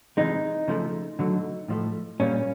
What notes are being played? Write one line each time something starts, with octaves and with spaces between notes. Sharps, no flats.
C3 E3 G#3 D#4
C#3 F3 A3
D3 F#3 A3
A2 F3 A3
A#2 G3 A#3 C#4